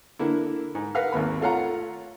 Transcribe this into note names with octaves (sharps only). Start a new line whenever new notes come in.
D3 A#3 E4
G#2
A#4 B4 F5 F#5 F6
G#1 D#2 A#3 B5
A3 F4 C#5 F5 F#5 A#5